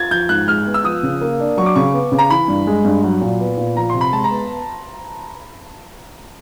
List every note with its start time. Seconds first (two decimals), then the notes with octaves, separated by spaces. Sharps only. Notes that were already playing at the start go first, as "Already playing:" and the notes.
Already playing: F4 G#6 A6
0.11 F3 G6
0.29 G#2 F#6
0.48 G#3 F6
0.67 B3
0.74 E6
0.84 F3 D#6
1.03 C#3
1.21 A#3
1.40 D4
1.58 F#3 C#6
1.66 D6
1.76 C#3 C#6
1.94 B3
2.12 C#3
2.19 A#5
2.30 E3 B5
2.48 G2
2.67 G#3
2.85 G2
3.03 F#3
3.21 A#2
3.40 B3
3.57 A#2
3.76 F3 A#5
3.90 C3 C6
4.01 B5
4.12 G#3 A5
4.24 A#5
4.31 B3